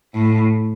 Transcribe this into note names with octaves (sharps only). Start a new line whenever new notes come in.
A2